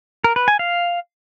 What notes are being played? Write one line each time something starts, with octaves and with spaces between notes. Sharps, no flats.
A#4
B4
G#5
F5